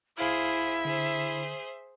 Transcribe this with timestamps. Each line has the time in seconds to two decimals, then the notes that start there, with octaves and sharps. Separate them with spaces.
0.18 C#2 E4 G#4 C5 E5 F5 F6
0.85 D3 G#4 C5